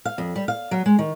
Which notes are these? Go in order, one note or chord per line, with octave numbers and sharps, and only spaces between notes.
F5
F2
G3
F5
F#3
G#3
D#3